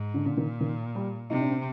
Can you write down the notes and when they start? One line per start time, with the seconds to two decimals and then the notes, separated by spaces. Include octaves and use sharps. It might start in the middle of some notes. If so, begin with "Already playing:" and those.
Already playing: G#2
0.14 D3
0.26 A#2 D3
0.37 D#3
0.61 D#3
0.95 G3
1.30 C3 D#4
1.41 D4
1.51 C4